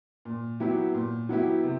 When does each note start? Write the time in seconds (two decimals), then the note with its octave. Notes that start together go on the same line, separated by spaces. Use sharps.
0.25 A#2
0.60 F#3 B3 E4 G4
0.94 A#2
1.29 F#3 B3 E4 G4
1.64 C3